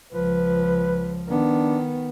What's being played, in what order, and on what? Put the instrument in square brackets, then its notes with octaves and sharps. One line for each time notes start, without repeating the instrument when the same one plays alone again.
[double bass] C#2 F3 [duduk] B4
[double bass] D#3 B3 [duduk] D4